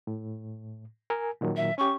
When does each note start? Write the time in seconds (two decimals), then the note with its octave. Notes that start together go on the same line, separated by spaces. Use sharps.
0.07 A2
1.10 A#4 G#5
1.41 A#2 D#3 F#3
1.56 E5
1.78 C#4 G4 C#6